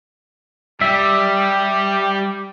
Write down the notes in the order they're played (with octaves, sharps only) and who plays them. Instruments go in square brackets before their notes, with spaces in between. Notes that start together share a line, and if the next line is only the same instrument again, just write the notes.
[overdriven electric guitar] G3 [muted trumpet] G4 [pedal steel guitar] E5